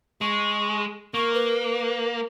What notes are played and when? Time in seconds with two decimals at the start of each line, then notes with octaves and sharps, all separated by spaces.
0.21 G#3 C#6
1.14 A#3 C#6
1.34 B4